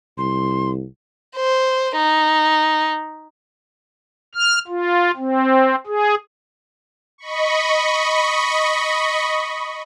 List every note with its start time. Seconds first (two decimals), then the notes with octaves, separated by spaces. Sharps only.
0.18 C2 C6
1.36 C5
1.97 D#4
4.35 F6
4.68 F4
5.16 C4
5.87 G#4
7.18 D#5 B5 C#6